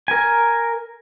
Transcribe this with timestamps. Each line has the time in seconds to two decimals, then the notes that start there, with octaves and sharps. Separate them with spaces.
0.08 A#4 G#5